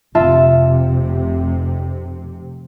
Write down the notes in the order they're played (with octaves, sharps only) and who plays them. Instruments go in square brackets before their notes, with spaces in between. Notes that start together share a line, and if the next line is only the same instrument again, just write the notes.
[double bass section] F1 C3 [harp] F4 E5 A5